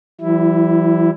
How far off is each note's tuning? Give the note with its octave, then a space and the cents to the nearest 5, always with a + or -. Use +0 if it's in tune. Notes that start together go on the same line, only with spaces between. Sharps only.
E3 +35 G3 -40 E4 +0